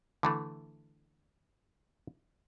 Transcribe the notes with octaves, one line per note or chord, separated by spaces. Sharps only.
D3 E3 A3